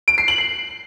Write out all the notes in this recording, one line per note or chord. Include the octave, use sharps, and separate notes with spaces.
D7
C7
F#7
C7